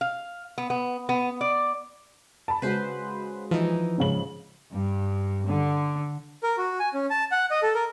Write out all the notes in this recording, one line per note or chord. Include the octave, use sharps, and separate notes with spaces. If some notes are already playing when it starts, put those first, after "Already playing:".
F5
B3
B3
B3
D5
A5 B5
C#3 G#3 F#4 B4 C5
E3 F3 D#4
G#2 C#3 F#7
G2
D3
A#4
F#4
G#5
C#4
A5
F#5
D#5
A4
A#4